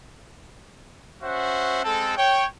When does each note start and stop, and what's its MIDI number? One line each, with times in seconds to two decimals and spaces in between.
1.22 1.82 61
1.22 1.82 66
1.22 1.82 72
1.22 1.82 76
1.22 1.82 78
1.84 2.14 56
1.84 2.14 60
1.84 2.14 69
2.17 2.46 73
2.17 2.46 79